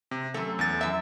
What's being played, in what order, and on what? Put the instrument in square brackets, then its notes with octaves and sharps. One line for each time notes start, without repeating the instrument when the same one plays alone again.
[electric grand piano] C3
[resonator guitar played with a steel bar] F#2 A3 [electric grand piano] A4
[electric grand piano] E2 A6
[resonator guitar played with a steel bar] F#2 E5